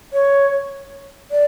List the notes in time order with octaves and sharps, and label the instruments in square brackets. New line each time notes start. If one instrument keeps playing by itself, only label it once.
[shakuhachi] C#5
D5